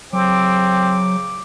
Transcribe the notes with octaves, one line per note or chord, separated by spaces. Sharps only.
C#3 F#3 C4 D6